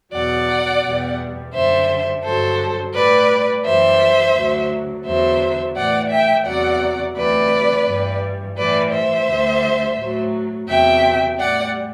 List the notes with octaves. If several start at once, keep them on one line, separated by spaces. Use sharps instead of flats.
E2 B2 F#3 D5 F#5
E2 B2 G3
F#2 D3 G3 C5 E5
G2 D3 F#3 A4 C5
A2 G3 B4 D5
F#2 E3 G3 C5 E5
D2 D3 F#3
E2 D3 F#3 C5 E5
A2 E3 G3 D5 F#5
E5 G5
E2 C3 F#3 D5 F#5
D2 C3 E3 G3 B4 D5
G2 E3 G3
A2 E3 G3 B4 D5
C5 E5
D2 D3 G3
A2 F#3
E2 C3 F#3 E5 G5
A2 G3 D5 F#5